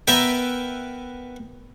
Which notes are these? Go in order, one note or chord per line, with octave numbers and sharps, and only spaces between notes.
B3 A#4 B4 E5 G5